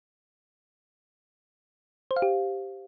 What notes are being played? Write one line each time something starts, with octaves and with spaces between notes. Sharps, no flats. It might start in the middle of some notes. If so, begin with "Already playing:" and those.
C5
F5
G4